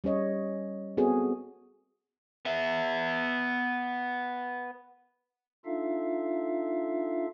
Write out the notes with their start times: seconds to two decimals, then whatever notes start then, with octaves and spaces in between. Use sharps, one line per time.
0.04 G3 C#4 C#5 D#5
0.97 B3 C4 F#4 G#4 A4 C#5
2.45 B3 E5
5.65 D4 D#4 F4 A4 E5 F5